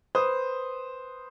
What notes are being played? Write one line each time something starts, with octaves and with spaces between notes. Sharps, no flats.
B4 C5 D#6